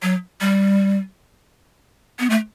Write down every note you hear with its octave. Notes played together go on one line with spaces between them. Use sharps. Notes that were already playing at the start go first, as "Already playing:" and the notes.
F#3
G3
B3
A3